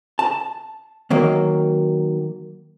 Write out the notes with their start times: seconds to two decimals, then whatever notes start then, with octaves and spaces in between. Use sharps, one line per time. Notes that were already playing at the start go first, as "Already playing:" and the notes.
0.19 A5
1.10 D#3 F#3 A#3